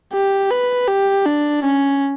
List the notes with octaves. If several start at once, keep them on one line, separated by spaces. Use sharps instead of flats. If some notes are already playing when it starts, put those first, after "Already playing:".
G4
B4
G4
D4
C#4